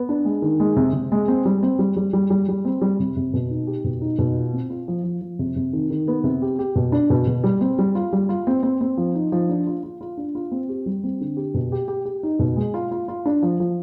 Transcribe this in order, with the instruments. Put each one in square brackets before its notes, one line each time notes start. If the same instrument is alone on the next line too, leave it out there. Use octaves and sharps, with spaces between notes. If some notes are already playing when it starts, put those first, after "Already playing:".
Already playing: [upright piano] B3
D4
G#3
D#3
G#3
C3
C3
G#3
C4
G3
C4
G3
G3
G3
G3
G3
C4
G3
C3
C3
B2
D#4
G4
B2
D#4
B2
F4
C4
F4
F3
F3
F3
C3
C3
D#3
D#3
B3
C3
G4
G4
B2
D4
B2
B2
G3
C4
G3
F4
G3
F4
C4
C4
C4
F3
D#4
F3
D4
F4
F4
F4
D4
F4
C4
G4
G3
C4
D3
G4
B2
G4
G4
G4
D#4
B2
G#3
F4
F4
F4
D4
F3
F3